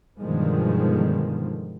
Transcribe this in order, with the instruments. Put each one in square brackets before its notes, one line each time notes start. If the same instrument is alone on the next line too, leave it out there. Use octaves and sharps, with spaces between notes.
[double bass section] G2 B2 D3 D#3 F3 G#3